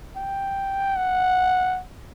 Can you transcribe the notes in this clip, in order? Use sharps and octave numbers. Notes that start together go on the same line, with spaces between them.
G5
F#5